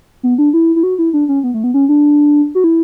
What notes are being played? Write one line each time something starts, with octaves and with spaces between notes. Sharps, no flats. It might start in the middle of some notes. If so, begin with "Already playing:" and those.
B3
D4
E4
E4
F#4
E4
D4
C#4
B3
A3
B3
C#4
D4
F#4
E4